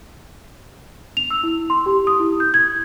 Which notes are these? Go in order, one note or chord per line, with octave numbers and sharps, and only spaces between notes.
F7
E6
E4
C6
G4
D#6
E4
G6
G#6